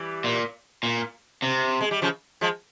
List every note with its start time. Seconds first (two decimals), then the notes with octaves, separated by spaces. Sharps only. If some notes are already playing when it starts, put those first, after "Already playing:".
Already playing: E3 G3
0.24 A#2
0.83 A#2
1.42 C3
1.81 G#3
1.91 G3
2.02 C#3 F3
2.41 F3 G#3